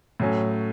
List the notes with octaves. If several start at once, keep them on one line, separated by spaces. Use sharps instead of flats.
A2 F#3 C#4